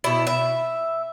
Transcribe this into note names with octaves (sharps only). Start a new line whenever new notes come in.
B2 E4
E5